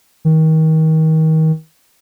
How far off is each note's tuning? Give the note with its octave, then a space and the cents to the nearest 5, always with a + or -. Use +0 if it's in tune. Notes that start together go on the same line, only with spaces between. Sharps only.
D#3 +30